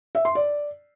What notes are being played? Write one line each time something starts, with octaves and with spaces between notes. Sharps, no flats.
E5
C6
D5